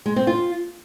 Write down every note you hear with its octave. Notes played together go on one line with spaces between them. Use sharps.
G#3
C4
F4